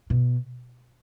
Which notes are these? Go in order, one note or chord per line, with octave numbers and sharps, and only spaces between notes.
B2